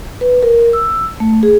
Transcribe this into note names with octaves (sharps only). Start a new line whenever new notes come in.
B4
A#4
E6
A3
G#4